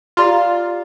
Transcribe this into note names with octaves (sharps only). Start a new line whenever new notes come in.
F4 G4 D5 A#5